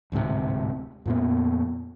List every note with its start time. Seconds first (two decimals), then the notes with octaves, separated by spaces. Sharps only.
0.12 D1 D2 G#2 C3
1.06 F2 A#2 B3